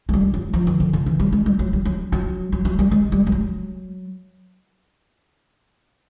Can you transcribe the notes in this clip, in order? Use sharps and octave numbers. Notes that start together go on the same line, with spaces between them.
G#3
G3
F#3
F3
D#3
D3
C#3
E3
G3
G#3
G3
F#3
G3
F#3
F#3
F#3
F#3
G3
G#3
G3
G3
F#3